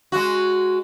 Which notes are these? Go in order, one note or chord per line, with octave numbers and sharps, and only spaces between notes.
G#3 F#4